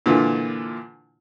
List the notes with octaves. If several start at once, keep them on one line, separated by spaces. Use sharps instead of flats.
A#2 D3 E3 F4